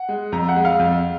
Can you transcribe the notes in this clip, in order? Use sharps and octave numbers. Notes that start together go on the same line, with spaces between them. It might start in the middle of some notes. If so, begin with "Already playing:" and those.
Already playing: F#5
G#3
F2 A#5
F#5
G#3
F5
F2